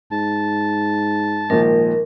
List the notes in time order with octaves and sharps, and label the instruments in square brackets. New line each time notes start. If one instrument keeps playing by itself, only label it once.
[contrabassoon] G#2 [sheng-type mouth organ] A5
[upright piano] G#1 A#2 F3 [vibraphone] A#4